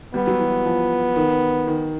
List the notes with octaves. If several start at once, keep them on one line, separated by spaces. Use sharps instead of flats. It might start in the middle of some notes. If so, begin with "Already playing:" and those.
G3 B3
F#3
E3
F3
D#3
D#3